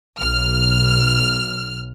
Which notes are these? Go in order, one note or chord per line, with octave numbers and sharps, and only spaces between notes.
B1 F6